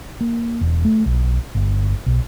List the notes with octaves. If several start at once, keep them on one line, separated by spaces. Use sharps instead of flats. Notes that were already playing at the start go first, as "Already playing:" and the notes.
A#3
E1
A3
B1
G1
B1